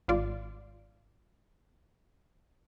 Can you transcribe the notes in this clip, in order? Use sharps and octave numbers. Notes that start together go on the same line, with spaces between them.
G#1 F4 D5